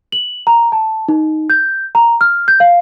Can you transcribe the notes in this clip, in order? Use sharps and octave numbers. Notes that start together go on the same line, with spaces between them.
F#7
A#5
A5
D#4
G6
A#5
F6
G6
F5